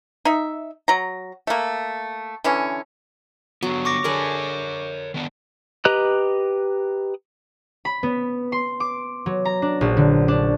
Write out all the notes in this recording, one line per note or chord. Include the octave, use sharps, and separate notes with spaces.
D#4 E5
F#3 A#5
A3 A#3
D3 E3 C#4
D3 F#3 B3
C#6 D6 A#6
D3 G#4 A#4 B4 C#5
D#3 B3 D4
G4 B4 D#5 A#5 F#6
B5
B3
C6
D6
F#3
A#5
D4
A#1
D3
D4